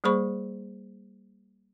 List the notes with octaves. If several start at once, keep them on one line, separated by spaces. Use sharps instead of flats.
G3 A#3 G#4 C5 B5 C#6